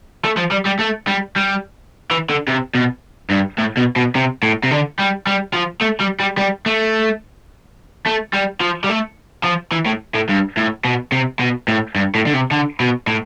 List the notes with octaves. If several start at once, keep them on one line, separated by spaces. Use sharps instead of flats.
A3
F3
G3
G3
A3
G3
G3
E3
D3
C3
B2
G2
A2
B2
B2
C3
A2
C3
D3
G3
G3
F3
A3
G3
G3
G3
A3
A3
G3
F3
G3
A3
F3
E3
A2
A2
G2
A2
B2
C3
B2
A2
G2
A2
D3
C3
D3
B2
A2